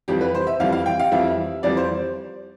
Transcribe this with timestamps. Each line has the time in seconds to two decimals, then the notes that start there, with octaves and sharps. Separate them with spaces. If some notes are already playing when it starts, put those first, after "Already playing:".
0.08 F2 E3 G3 G4
0.21 B4
0.35 C5
0.47 E5
0.60 F2 E3 G3 F5
0.72 F5
0.86 G5
1.00 F5
1.12 F2 E3 G3 E5
1.63 F2 E3 G3 D5
1.77 C5